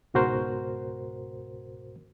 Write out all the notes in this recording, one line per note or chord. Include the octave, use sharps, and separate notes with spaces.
C#2 G#2 B2 F#4 A#4 C5